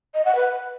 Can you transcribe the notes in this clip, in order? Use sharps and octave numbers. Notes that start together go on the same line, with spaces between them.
D#5
F#5
B4